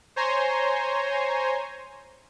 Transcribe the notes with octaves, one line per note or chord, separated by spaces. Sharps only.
C5 C#5 G#5 A#5 C6